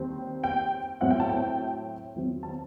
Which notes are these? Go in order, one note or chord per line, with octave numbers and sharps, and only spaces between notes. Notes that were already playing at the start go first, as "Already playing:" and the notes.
Already playing: D#2 D#3 G3 C4
G5
A2 F#3 C4 E4 F#5
G5
A5
G5
E2 D#3 F#3 C4
A5